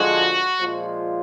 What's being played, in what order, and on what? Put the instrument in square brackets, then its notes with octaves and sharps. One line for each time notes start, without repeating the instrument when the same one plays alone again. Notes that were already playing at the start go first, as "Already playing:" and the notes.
Already playing: [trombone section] D3 F3 G#3 [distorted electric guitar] F#4
[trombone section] A#2 F3 G#3